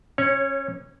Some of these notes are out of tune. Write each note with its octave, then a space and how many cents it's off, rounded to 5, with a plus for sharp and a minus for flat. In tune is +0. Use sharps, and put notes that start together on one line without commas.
C#4 -25 C#5 +0